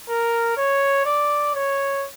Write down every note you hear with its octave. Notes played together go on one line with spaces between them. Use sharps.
A#4
C#5
D5
C#5